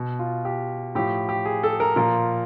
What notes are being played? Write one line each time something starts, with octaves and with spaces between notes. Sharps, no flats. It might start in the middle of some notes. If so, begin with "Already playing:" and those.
Already playing: B2
F4
G4
A2 F3 G4
G4
G#4
A4
A#4
A#2 F3 A#4